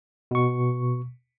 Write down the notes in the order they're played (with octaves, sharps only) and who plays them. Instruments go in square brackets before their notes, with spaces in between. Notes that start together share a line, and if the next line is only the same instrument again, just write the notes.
[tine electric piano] B2 C#6